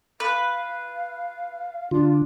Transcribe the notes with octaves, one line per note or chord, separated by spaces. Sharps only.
B4 F5
D3 D4 F4